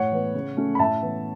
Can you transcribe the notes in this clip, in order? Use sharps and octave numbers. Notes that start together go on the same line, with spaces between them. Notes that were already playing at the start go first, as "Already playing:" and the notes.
Already playing: A2 C#5 F#5
E3 B3
C#3
A3 C#4
B5
A2 E5 A5
E3 B3